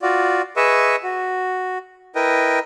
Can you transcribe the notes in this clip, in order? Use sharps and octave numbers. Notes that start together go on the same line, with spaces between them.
F4 F#4 D5
G#4 B4 D#5 E5 C#6 E6
F#4
E4 A#4 B4 D#5 G5